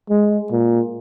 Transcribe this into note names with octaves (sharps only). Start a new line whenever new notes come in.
G#3
A#2